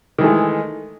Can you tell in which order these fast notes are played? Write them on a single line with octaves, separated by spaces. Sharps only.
D#3 E3 A3 G#3